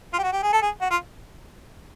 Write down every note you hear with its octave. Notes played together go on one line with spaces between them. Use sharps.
F4
G4
F#4
G4
G#4
A4
G#4
F#4
F4